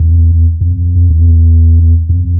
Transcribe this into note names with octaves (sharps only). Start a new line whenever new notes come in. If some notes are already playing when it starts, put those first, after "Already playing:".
Already playing: E2
F2
E2
F2